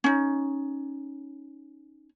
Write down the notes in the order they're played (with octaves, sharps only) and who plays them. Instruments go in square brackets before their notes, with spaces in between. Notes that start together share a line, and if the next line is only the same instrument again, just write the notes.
[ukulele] C#4 D#4